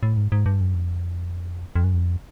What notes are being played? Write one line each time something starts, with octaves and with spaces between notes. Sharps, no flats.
A2
G#2
G#2
G2
F#2
F2
F2
F#2
F2